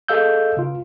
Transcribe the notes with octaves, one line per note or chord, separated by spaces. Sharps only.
G#4 A4 D#5 F5 E6 G6
C#3 F4